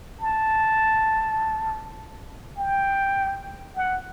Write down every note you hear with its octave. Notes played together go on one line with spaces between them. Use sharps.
A5
G5
F#5